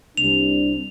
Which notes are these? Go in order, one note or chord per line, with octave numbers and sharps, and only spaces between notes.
C2 C3 G3 D4 F7